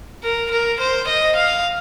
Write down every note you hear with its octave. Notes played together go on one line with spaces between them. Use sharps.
A#4
A#4
C5
D#5
F5